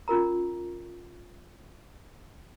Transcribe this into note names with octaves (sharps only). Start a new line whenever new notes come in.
C#4 F4 A#4 A#5